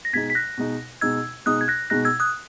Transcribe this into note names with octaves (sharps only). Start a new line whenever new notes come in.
A#6
B2 G#3 D#4 G#6 B6
B6
F#6 A#6
B2 G#3 D#4
B2 G#3 D#4 E6 G#6
B2 G#3 D#4 D#6 F#6
G#6
F#6 A#6
B2 G#3 D#4 F#6 A#6
E6 G#6
D#6 F#6